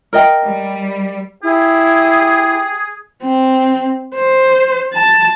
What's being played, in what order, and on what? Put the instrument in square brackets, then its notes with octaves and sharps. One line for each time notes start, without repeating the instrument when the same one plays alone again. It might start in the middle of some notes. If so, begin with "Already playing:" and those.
[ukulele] A#4 D#5 G5
[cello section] G3
[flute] E4 [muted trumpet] G4 [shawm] G#4
[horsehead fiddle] C4
C5
A5